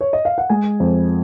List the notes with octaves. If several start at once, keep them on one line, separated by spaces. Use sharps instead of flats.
C#5
D#5
F5
F#5
G#3 G#5
F2